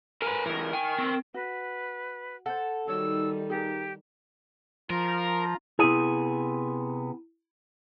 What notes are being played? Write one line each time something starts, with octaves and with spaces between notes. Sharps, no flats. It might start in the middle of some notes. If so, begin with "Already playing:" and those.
A#4 B4 G#5 A#5
C#2 E3 A#4
A#4 G5 G#5
C4
F#4 B4
A4 C5 F#5
D#3 G3 D#4 F#4 C#5 E6
G4 G#4 A#4
F3 F4 A#4 A#5
C3 B3 E4 G#4 D#7